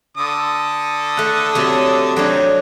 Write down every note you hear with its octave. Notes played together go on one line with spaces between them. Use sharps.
D3 A4 D#6
A3 F#5
C3 F#3 A3
F#3 A3 C4 D4 D#4